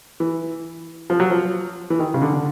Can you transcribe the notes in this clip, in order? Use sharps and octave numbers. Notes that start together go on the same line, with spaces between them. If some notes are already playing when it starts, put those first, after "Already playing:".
E3
F3
F#3
F3
E3
D#3
C#3
D3
D3